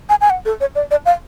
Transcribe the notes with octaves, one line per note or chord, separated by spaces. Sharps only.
G#5
G#5
F#5
A4
C#5
D5
D5
F5